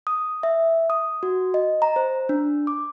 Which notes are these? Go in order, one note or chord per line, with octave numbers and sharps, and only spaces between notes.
D#6
E5
D#6
F#4
D#5
A#5
C5
D4
D6